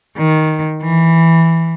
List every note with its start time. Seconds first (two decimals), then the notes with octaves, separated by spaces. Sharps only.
0.18 D#3
0.82 E3